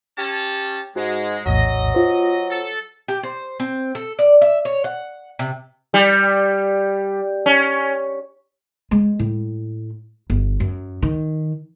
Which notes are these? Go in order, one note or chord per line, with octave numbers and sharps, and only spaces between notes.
C#4 G4 A5
G#2 G#3 F#4
A#1 E2 A2 F#3 D#5
F4 C5
A4
G4
C5
C4
A4
D5
E5
C#5
F#5
C3
G3
C#4
G#3
A2
G1
F#2
D#3